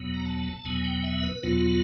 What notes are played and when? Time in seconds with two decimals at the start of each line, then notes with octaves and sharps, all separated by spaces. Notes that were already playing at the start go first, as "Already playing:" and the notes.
Already playing: E2 B2 F#3 B3
0.14 A#5
0.26 A5
0.64 E2 B2 F#3 B3 G#5
0.84 G5
1.04 E5
1.23 B4
1.43 E2 B2 F#3 B3 F4